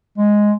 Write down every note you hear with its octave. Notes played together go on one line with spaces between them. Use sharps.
G#3